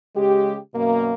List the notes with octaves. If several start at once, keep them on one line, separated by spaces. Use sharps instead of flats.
C#3 G#3 G4
F#2 B2 A#3